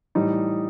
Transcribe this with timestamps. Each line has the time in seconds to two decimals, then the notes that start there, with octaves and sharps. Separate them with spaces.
0.15 A2 E3 G3 D#4